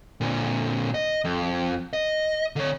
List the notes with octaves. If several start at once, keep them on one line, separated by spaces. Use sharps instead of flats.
A#2 D3
D#5
F2
D#5
D3 C#5